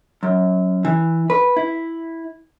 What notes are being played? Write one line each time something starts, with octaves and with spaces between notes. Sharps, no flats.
F#2
E3
B4
E4